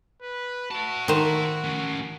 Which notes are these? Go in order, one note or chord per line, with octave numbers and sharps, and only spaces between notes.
B4
E4 F#4 A5
D#3 C5
A2 C#4